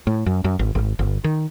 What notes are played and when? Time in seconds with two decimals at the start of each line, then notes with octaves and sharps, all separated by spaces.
0.07 A2
0.26 F#2
0.44 F#2
0.59 G#1
0.75 G#1
0.99 G1
1.24 D#3